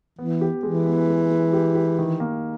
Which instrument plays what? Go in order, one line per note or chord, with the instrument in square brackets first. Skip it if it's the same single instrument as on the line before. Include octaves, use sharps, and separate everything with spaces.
[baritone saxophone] E3 [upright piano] B3
[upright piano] G4
[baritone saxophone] E3 [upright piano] G#3
[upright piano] B3
G#3
G#3
G4
G4
D#3
A#3